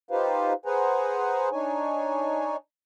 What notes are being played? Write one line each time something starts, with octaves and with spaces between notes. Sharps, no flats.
D#4 F4 G4 B4 C5 F5
G#4 B4 C5 F#5 G#5 A#5
D4 D#4 C#5 G#5